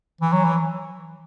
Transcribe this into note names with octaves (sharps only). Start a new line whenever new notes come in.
E3
F#3
E3